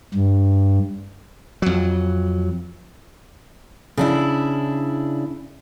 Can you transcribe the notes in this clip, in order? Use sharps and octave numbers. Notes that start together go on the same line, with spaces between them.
G2
F2 F#3
C#3 D4 E4